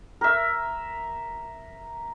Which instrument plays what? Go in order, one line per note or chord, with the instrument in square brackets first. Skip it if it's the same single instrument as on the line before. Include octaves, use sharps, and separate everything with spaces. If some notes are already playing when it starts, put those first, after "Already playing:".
[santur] A#4 E5